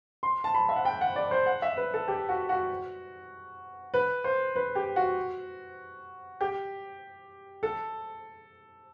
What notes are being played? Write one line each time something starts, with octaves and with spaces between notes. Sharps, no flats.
C6
A5
B5
E5
F#5
G5
F#5
D5
C5
F#5
E5
B4
A4
G4
F#4
F#4
B4
C5
B4
G4
F#4
G4
A4